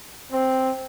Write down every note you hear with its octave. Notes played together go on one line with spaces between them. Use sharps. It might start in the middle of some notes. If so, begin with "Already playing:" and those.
C4